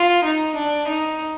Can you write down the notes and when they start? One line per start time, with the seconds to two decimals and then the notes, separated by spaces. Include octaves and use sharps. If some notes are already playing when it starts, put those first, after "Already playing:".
Already playing: F4
0.25 D#4
0.56 D4
0.88 D#4